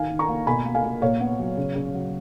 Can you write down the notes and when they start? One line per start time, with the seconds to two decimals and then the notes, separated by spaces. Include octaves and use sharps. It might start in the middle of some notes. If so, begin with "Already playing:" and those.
Already playing: D#3 F5 G#5
0.10 D#3
0.19 A#5 C#6
0.28 A#3
0.47 B2 G#5 B5
0.65 A#3
0.75 F5 G#5
0.84 A#3
1.02 A#2 C#5 F5
1.20 B3
1.39 F#3
1.57 C#3
1.75 C#3
1.94 F#3